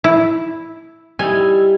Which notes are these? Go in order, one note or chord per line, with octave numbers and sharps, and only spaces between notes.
E4
G3 D#4 E4 G#5